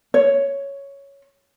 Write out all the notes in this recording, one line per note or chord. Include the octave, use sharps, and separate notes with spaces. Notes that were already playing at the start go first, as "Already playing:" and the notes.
C#5